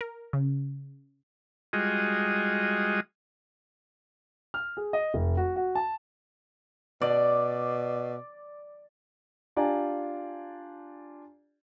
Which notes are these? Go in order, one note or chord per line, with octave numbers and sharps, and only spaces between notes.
A#4
C#3
G3 G#3 F4 F#4 G#4 D#5
F6
G#4
D#5
F1
F#4
F#4
A5
B2 D5
D4 F4 G4 D5 G#5 A#5